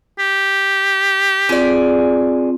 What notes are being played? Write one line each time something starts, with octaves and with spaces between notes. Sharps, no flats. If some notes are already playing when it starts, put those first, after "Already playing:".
G4
C4 F4 G#4 D5